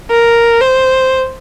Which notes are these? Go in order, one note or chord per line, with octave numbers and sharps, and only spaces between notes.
A#4
C5